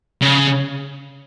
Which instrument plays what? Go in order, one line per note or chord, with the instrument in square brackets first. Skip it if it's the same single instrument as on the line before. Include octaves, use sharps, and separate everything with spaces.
[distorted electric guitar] C#3